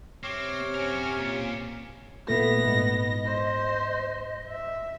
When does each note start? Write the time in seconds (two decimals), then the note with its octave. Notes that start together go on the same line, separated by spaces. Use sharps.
0.23 C3 C4 C#5 D6 F6
0.74 C#4 F#4 A#4
1.18 A#2
2.28 A#2 A3 B3 E5 A#6
2.65 G#2 D#5
3.26 C5
4.49 E5